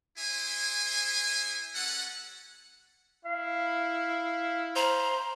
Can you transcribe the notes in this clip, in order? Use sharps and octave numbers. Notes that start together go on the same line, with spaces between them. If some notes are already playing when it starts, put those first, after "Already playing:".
E4 G#4 C5 E5 G#5
G3 C#4 A4 F#5
E4 F5
C5 A#5